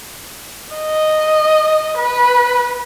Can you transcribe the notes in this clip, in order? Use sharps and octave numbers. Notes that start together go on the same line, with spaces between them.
D#5
B4